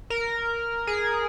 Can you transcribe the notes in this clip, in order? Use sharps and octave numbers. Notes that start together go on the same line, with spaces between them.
A#4
G#4